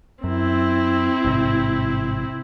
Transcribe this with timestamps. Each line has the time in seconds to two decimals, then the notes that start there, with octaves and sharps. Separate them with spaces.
0.24 F#2 C4 E4
1.25 A1 G#2 C3